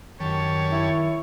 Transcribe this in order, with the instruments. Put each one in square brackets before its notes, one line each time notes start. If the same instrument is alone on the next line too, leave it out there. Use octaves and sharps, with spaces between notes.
[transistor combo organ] F#2 G4 A5 [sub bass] D#3 [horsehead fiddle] C#5
[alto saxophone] E4